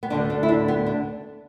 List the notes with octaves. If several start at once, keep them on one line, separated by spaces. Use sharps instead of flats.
B3
D2 D3 A3 D4
D4
E4
D4
B3
D4